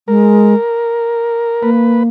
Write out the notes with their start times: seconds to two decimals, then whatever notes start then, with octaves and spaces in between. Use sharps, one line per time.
0.08 G#3 A#4
1.63 A#3 B4